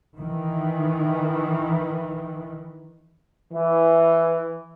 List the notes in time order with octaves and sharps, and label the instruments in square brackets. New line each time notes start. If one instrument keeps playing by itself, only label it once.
[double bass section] D#3 E3
[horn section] E3